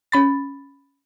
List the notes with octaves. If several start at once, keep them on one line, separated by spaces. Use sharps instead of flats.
C#4 B5 A6